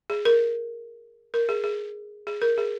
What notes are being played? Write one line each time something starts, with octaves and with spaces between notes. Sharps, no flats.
G#4
A#4
A#4
G#4
G#4
G#4
A#4
G#4